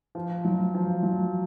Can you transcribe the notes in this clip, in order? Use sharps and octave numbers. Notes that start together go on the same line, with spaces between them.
F3
F#3
F3
F#3